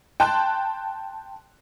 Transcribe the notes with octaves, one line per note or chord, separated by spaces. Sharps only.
G5 A5 C6 F#6